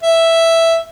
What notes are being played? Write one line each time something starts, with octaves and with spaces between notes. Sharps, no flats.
E5